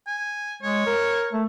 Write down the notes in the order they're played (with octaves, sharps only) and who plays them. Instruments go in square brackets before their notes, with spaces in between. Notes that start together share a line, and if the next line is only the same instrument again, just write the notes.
[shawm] G#5
[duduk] G#3 [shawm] C#5
[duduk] A#4
A3